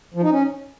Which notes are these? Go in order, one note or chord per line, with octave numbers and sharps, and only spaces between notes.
F3
D#4
C#4